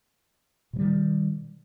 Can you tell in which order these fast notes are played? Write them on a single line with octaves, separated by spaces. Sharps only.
B2 F#3 G3 D#3